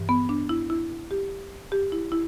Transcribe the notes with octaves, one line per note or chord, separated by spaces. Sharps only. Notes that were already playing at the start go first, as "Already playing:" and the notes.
Already playing: G2 E3
B3
D4
E4
E4
G4
G4
E4
E4